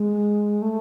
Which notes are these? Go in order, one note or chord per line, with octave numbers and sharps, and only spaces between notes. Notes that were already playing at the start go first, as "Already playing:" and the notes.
Already playing: G#3
A3